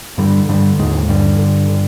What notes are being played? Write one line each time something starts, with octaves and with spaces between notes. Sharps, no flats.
G2 D3 G3
G2 D3 G3
D#2 G#2 G#3
G2 D3 G3
D3
D3